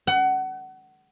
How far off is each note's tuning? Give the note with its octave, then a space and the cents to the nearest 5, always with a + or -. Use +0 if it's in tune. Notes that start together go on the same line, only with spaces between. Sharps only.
F#5 +25